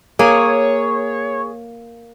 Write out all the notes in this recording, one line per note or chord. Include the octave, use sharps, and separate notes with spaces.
A#3 G#4 C#5